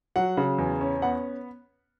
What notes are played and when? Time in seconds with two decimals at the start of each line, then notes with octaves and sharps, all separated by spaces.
0.16 F#3 F#5
0.37 C#3
0.58 E2
0.81 C#4
1.02 B3 F#5